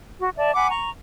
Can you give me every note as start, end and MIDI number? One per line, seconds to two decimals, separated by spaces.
0.19 0.30 66
0.38 0.53 74
0.38 0.53 76
0.38 0.53 81
0.55 0.70 78
0.55 0.70 80
0.55 0.70 83
0.55 0.70 86
0.71 0.90 82
0.71 0.90 85